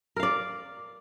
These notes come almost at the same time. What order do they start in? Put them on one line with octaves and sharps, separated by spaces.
A#4 F5 D5